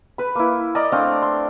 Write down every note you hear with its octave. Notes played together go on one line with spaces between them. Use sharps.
B4 B5
A#3 E4
A#4 D5 D#5 A#5
A3 C4 D4 F5
C6